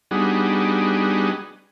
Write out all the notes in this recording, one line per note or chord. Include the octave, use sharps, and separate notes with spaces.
G3 B3 D4 D#4 F#4 G#4